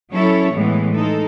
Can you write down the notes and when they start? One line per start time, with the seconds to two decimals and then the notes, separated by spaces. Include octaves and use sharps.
0.12 F#3 C#4 E4 A4 C#5
0.54 A2 E3 G#3 B3
0.95 G#3 D#4 A4